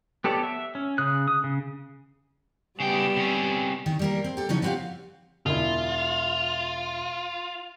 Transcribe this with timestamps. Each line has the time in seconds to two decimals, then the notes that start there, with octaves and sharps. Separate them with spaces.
0.24 B3 G4 A4 C#5 D5
0.43 E5
0.75 C#4
0.98 C#3 D#6 F#6
1.28 D#6
1.44 C#3
2.80 C#3 G3 B3 G4 G5
3.16 C3 C#4
3.86 D#3
3.99 G3 A#3 A#4
4.24 C4
4.37 G4 A4
4.49 C#3 F3 F#3 D#4 C#5
4.62 C4 E4 F#4 G4 F5
5.46 E1 E4 F4